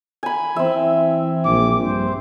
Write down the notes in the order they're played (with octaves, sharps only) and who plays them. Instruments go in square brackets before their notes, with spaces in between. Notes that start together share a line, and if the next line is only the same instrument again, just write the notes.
[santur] G#5 B5
[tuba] E3 [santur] C4 E5
[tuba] A#1 [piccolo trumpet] D6
[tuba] G2 [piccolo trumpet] C5